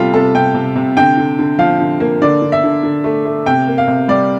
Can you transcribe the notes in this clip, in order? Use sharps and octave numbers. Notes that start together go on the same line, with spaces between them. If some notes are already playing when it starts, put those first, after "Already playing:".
Already playing: C3 G3 F4 A4
C3 A4
C3 G5
C3
C3
D3 G5
D3
D3
F3 F5
D3
A#3
D3 D5
D3
E5
D3
D3
A3
A3
C3 G5
A#3
F5
C3
G3 D5